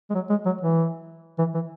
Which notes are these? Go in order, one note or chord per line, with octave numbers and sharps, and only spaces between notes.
G#3
F#3
G#3
F#3
E3
E3
E3